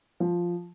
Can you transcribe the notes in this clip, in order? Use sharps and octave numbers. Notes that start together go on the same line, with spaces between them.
F3